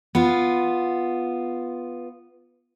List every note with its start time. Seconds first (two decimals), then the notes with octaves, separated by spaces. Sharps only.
0.15 B3 F4